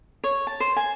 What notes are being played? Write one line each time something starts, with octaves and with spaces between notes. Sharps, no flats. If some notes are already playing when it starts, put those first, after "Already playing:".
C#5
A5
C5
G#5